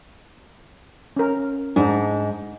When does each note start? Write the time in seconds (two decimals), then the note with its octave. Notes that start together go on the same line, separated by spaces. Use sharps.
1.16 C#4 A#4
1.76 G#2 D4 D#4